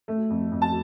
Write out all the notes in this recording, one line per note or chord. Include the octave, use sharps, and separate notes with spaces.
A3
F2
F2
A5